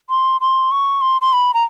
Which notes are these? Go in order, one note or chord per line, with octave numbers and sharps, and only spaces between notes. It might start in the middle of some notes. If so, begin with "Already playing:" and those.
C6
C6
C#6
C6
C6
B5
A#5